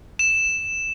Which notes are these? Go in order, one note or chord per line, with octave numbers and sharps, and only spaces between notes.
E7